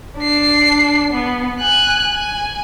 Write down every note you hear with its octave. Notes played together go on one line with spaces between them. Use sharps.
D4 C7
B3
G#5 F#6
G#5